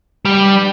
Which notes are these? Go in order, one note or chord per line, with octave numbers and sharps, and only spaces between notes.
G3 D4 G4 B4 D5